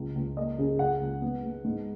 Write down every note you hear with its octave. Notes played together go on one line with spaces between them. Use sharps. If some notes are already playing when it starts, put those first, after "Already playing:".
Already playing: C#2
C#2
A#3 D#5
C#3
C#2 F#5
C#2
B3
B3
G#2